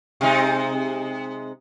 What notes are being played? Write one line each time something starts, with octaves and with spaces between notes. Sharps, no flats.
C3 G#3 D#4